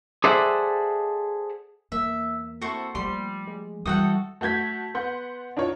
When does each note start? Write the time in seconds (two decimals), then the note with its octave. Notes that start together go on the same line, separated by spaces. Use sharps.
0.24 G#4 A4 C5 D5 E5 F#5
1.92 E2 A#3 E5
2.61 C4 E4 F#4 A4 C5 C#6
2.95 F3 G3 A3 C6
3.47 G#3
3.86 E3 G3 E4 F#4 A4 F#5 G5 D#6
4.41 A3 F#4 G6 G#6 B6
4.94 B3 F#5 C6 G6
5.57 D4 D#4 F4 C#5